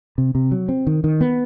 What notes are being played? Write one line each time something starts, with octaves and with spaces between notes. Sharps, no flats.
C3
C3
F#3
C4
D#3
D#3
B3